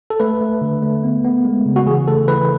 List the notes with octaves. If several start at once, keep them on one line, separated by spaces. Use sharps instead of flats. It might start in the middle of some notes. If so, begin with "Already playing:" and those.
A4
A3 B4
A3
D3
A3
B3
B3
G#3
C#3
F#4
E3 G#4
A3 A4
E3 B4